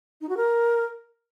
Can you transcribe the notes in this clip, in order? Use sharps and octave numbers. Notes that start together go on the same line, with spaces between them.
D#4
F#4
A#4